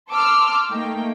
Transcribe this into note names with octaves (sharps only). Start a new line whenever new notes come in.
A5 C6 D6 E6 F6
A3 A#3 D#4 G5